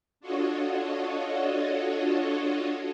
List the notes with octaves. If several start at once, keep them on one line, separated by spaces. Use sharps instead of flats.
D4 F4 F#4 A4 C#5 D#5